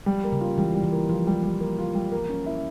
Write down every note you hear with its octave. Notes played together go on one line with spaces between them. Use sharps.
F3 G3
A#3
C#3
F4
E3 G3
G3
E3
A#3
F3 F4
G3
G3
A#3
F4
G3
A#3
C#4
E4